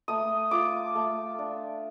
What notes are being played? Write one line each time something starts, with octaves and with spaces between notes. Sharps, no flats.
A3 D#6
F4 D6
A3
D4